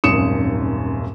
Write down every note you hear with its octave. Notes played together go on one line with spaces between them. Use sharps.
D#1 G#1 F#2 D#6 C#7 E7